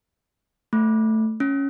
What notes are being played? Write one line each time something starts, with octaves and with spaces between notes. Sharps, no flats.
A3
C#4